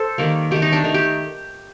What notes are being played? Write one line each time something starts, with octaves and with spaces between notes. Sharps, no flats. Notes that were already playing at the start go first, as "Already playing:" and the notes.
Already playing: A4 C5
D#3 G3 A#3
D#3 A3 G4
D#4
D4
D#3 A3 D#4
G4